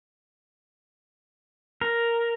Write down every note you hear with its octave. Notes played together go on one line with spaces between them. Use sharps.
A#4